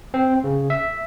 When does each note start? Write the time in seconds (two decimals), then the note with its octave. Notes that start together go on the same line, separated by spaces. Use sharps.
0.14 C4
0.44 C#3
0.70 E5